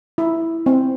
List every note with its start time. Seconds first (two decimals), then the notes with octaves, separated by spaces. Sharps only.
0.18 E4
0.66 C4